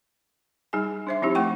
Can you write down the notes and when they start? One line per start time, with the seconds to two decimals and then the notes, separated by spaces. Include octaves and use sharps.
0.73 G3 D#4 G#4 G#5
1.07 D4 C5 E5
1.22 F3 C4 D#4 E4 G4
1.35 A3 F#5 G5 C#6